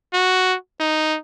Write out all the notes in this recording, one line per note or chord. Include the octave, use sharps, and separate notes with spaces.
F#4
D#4